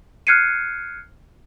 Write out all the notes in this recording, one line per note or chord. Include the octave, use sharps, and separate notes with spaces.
F6 F#6 G#6 C7 C#7 D#7